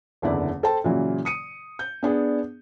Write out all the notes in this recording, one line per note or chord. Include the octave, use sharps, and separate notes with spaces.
F#1 E2 D3 E4 D5
A4 C5 G5 A5
A#2 C#3 E3 F#3
D#6 C#7 D#7
G6
B3 D4 G#4